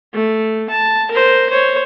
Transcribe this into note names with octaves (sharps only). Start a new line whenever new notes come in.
A3
A5
A#4 C5
C5 C#5